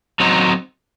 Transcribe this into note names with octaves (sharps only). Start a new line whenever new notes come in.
F#3 C4 D#4